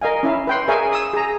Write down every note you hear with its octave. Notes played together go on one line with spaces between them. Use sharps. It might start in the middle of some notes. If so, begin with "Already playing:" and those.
A#4 D#5 F5 G#5
C#4 E4 E5 F5
B4 G5 C6
G#4 A#4 C#5 E5 F5 G#5
D#6 E6
G#4 A#5